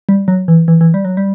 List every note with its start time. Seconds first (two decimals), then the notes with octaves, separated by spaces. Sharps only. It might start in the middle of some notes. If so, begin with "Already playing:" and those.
0.09 G3
0.28 F#3
0.48 E3
0.68 E3
0.81 E3
0.94 G3
1.05 F#3
1.17 G3